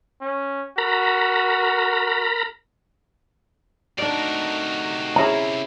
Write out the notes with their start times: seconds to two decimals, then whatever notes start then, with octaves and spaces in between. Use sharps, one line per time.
0.21 C#4
0.78 F#4 A#4 A#5 B5
3.98 C3 A3 D4 D#4 F#4 A#4 D5
5.16 C#4 E4 G#4 A#5